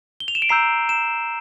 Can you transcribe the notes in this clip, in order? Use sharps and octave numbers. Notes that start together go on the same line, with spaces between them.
G7
F7
E7
D7
A#5 E6 G6 C7
E7